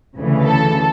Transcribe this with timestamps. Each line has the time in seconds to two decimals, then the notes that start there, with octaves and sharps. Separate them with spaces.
0.17 D2 C#3 E3
0.45 A4